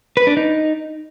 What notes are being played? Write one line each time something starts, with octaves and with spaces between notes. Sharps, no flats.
B4
D4
D#4